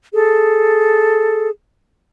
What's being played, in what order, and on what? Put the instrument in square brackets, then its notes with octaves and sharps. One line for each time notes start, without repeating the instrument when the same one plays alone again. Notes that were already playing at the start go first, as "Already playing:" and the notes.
[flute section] G#4 A4